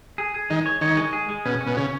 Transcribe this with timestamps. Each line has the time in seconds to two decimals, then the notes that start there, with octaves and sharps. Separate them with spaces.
0.18 G#4
0.34 G#4
0.50 D#3 G#3
0.66 C#5
0.81 D#3 C#5
0.97 G#3
1.13 G#4
1.29 G#3
1.45 B2 C#4
1.61 C#4
1.67 B2
1.77 C#3 C#4